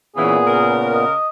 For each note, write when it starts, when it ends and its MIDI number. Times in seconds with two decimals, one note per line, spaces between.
0.16 1.05 46
0.16 0.36 49
0.16 0.36 52
0.16 1.05 59
0.16 0.80 68
0.47 1.13 49
0.47 1.13 70
0.94 1.29 75